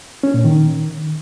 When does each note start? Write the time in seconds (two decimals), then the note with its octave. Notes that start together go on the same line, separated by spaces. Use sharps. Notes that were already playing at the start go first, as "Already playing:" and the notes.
0.23 C#4
0.34 A#2
0.45 D#3